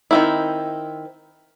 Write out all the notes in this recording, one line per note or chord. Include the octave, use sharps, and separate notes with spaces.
D#3 C4 E4